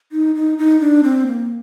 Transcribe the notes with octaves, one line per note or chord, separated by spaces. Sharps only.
D#4
D#4
D#4
D4
C4
A#3